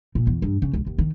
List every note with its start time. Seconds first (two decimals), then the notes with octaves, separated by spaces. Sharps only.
0.15 A#2
0.27 E2
0.42 G2
0.62 C#3
0.73 C#2
0.87 D#2
0.98 D#3